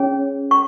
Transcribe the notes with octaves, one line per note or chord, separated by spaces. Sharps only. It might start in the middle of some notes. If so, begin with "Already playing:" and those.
Already playing: C#4 G#4 C#5
C#6